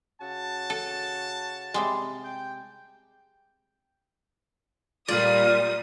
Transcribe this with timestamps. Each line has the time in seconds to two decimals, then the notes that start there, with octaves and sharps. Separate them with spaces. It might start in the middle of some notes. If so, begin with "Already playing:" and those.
0.22 C#3 F#4 A5
0.70 A4
1.74 C3 G3 G#3
2.25 G5
5.08 A#2 G3 F4 D5 D#6